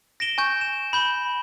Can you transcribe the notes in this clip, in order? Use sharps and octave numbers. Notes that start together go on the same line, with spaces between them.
A#6 D7 E7 G7
G#5 C#6 G6
E7
B5 G6 G7